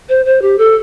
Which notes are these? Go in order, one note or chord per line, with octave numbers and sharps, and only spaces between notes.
C5
C5
G4
A4